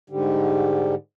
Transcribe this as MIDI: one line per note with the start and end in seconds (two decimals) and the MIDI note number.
0.10 0.95 44
0.10 0.95 50
0.10 0.95 55